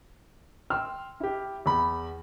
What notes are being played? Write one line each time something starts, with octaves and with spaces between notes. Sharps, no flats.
G5 C6 E6 F6
E4 G4
E2 B5